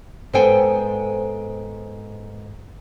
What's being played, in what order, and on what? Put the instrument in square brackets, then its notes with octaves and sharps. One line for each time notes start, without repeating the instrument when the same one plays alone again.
[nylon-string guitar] G#2 B3 A4 C5 G5 G#5